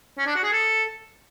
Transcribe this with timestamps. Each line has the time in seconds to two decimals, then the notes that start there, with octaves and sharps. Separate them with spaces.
0.18 C#4
0.26 D4
0.36 F#4
0.43 G#4
0.52 A4